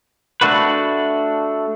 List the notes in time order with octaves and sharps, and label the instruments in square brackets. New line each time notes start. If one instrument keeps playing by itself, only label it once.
[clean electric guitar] A3 D4 F#4 B4